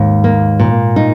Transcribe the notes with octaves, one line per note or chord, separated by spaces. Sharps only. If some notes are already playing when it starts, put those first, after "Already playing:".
Already playing: D#2 G#2
A#3
A#2
D#4